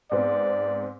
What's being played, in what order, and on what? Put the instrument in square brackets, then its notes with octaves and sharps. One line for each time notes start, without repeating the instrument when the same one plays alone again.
[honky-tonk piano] G#2 B3 C4 [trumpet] D5